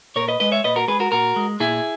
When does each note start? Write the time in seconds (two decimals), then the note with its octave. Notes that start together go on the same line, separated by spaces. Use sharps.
0.16 A#2 A#4 C#5
0.28 B4 D#5
0.40 G#3 B4 D#5
0.52 C#5 E5
0.64 A#2 B4 D#5
0.76 F#4 A#4
0.88 G#3 G#4 B4
1.00 F#4 A#4
1.12 A#2 F#4 A#4
1.36 G#3
1.60 A#2 E4 G#4